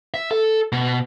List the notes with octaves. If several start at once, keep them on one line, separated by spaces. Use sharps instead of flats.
E5
A4
B2